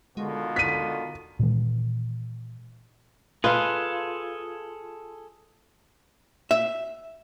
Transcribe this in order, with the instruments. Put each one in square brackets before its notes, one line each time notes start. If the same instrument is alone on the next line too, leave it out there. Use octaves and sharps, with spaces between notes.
[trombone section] B2 D#3 F4 [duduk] D3 [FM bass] G#3
[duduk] D3 [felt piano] B6 D#7
[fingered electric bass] A#2 D#3 E3 G#3
[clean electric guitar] F4 [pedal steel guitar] G#4 A4 [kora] B4 F5
[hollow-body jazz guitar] E5